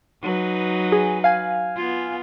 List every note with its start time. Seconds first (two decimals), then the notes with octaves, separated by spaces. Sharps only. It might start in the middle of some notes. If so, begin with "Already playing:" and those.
0.22 F#3 D#4 B4
0.92 G#4
1.24 F5 G#5
1.77 B3 F4